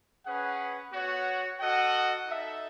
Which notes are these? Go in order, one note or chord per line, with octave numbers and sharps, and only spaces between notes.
C#4 G#4 B4 F#5
B3 F#4 C#5 F#5
F#4 A4 D#5 F#5
D#4 A4 E5